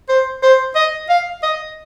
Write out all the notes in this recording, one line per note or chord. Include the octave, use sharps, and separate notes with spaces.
C5
C5
D#5
F5
D#5